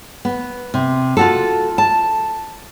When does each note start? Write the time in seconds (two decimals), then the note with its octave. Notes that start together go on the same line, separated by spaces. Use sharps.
0.25 B3
0.74 C3
1.17 F4 F#4 A4
1.78 A5